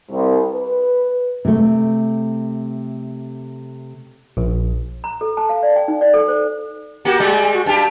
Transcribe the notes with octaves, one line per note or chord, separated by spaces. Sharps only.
C2
B4
C3 A3
A#1
A#5
A4
A5
F5
D5
G5
D#4
D5
A4
C5
A#3 F#4 G4
G3 G#3
G#5
F#4
G2 G4 A5